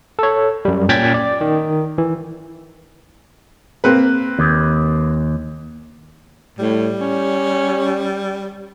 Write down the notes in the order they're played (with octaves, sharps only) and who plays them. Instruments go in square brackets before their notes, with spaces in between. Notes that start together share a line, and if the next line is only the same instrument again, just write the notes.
[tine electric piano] A4 C#5
F#2 G3
A#2 C#4 G5 G#6 A6 B6
D5
D#3
E3
[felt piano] A#3 C4 B4
[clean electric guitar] D#2
[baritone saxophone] A2 [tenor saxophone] G3
[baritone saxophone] C#4